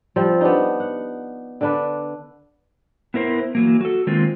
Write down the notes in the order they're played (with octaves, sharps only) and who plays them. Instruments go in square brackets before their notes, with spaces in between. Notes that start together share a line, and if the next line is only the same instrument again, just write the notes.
[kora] F3 G3 C4
B3 D4 D#4
F#5
D3 D4 B4
[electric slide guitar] B3 E4 A#4 C5
E3 F#3 A#3
F#4 A4
D#3 G#3 A#3 C4 F4